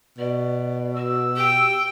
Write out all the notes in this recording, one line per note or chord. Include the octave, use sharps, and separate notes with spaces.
B2 D5
F#4 E6
G4 G5